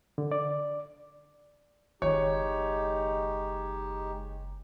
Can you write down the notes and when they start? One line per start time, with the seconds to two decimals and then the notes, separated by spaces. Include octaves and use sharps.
0.18 D3
0.32 D5
2.02 F#1 D#3 G#3 D#4 G4 C#5